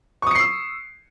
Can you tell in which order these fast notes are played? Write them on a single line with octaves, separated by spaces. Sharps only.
C#6 D#6 C#7 C7 E6